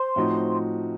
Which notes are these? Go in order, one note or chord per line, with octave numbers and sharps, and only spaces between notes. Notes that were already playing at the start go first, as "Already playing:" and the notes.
Already playing: C5 C6
A2 F3 C4 D#4 F#4